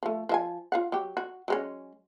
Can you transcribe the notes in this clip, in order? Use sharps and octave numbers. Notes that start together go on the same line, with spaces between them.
F3 A3
F3 E5 G#5
F4 F5 F#5
F#3 G4
F#4
F#3 G#3 C#4